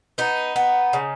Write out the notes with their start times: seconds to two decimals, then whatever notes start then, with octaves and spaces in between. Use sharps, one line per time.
0.18 B3 D#4
0.56 B3
0.93 C#3